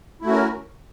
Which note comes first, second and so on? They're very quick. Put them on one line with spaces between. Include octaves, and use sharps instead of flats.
E4 A3 F#4 C#4 A#4